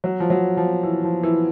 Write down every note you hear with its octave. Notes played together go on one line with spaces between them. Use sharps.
F#3
F3
F#3
F3
E3
F3
E3